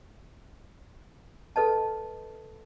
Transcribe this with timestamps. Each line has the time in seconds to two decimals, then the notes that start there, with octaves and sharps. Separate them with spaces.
1.56 A4 B4 D#5 A5